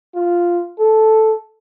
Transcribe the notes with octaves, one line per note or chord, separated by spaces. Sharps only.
F4
A4